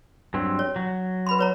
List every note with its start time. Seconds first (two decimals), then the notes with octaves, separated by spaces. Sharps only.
0.34 G2 F#3 C4
0.59 C#5
0.76 F#3
1.26 B4 B5 C6
1.39 B4 C#5 A#5